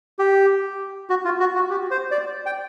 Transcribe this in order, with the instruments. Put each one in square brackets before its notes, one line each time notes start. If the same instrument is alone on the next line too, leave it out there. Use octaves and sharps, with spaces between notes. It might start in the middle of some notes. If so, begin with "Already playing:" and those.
[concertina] G4
F#4
F4
F#4
F#4
G4
C5
D5
G5